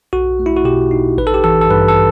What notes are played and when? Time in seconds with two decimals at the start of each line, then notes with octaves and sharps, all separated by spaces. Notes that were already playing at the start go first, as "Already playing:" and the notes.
0.13 B1 F#4
0.39 A3
0.46 E4
0.57 F#4
0.64 B2 G4
0.91 D#4
1.18 A1 B4
1.27 A4
1.34 G4
1.44 E3 A4
1.61 A4
1.70 G2 B4
1.88 A4